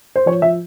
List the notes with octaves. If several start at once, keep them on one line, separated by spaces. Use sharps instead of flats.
C5
F3 C#5
F3 E5